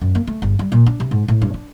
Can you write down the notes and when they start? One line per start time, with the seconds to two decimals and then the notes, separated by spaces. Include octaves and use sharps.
0.01 F#2
0.15 A#3
0.27 A3
0.42 G1
0.59 G3
0.72 A#2
0.86 D4
1.00 C3
1.11 G#2
1.28 A2
1.42 G2
1.54 D4